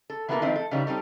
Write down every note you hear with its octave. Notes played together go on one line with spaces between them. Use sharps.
A4
E3 A#3 B3 E4 A4 A#4
D#3 F3 A3 C4 D#4 E4
A4
C#3 E3 G3 D#4 C#5
G3 C4 D#4 A4